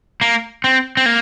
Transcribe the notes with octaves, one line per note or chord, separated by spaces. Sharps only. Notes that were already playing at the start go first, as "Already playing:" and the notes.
A#3
C4
C4
A#3